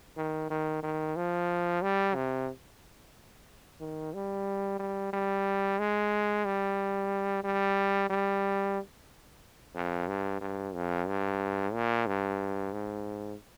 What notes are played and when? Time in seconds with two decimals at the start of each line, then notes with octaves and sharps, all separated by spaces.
0.17 D#3
0.50 D#3
0.83 D#3
1.16 F3
1.82 G3
2.15 C3
3.80 D#3
4.14 G3
4.79 G3
5.13 G3
5.79 G#3
6.45 G3
7.44 G3
8.10 G3
9.75 F2
10.08 G2
10.41 G2
10.74 F2
11.07 G2
11.73 A#2
12.06 G2
12.72 G#2